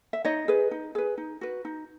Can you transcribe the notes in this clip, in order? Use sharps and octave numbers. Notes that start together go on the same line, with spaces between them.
E5
D#4 C#5 D#5
G#4 B4
D#4
G#4 B4
D#4
F#4 B4
D#4